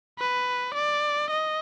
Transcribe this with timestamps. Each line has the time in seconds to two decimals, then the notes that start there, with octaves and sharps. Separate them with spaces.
0.19 B4
0.74 D5
1.30 D#5